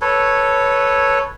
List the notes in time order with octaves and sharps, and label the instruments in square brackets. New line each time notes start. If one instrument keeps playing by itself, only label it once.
[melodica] A4 B4 C#5